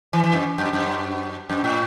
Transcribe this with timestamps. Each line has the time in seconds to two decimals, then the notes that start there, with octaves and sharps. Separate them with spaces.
0.13 E3
0.24 E3
0.33 F#2
0.58 F#2
0.73 F#2
1.49 F#2
1.64 A2